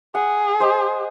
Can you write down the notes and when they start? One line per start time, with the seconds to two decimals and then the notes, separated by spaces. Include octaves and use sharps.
0.15 G#4 F#5
0.60 C5 D#5